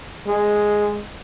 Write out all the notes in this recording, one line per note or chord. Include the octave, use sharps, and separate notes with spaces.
G#3